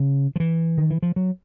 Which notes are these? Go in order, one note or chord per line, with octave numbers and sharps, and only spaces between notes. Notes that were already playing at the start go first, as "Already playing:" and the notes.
Already playing: C#3
F3
E3
D#3
E3
F3
F#3